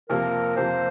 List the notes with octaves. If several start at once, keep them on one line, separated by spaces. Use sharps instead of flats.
F2 C3 F3 A#3 F4 A#4
F2 C3 F3 A#3 F4 C5